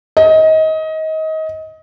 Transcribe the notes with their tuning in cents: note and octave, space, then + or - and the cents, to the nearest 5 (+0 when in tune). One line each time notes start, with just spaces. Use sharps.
D#5 +25